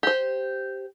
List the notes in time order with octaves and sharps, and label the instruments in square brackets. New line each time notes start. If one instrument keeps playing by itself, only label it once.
[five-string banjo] G4 C5